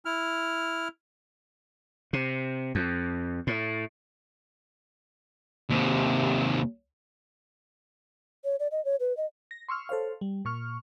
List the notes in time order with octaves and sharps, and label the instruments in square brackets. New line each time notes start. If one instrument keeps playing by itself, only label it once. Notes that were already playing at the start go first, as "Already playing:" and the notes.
[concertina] E4 F6
[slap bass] C3
F2
A2
[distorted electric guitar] D#2 C3
[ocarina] C#5
D5
D#5
C#5
B4
D#5
[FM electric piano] A#6
C6 C#6 E6 F6
A4 C5 C#5 F5
G3
A#2 C#6 F6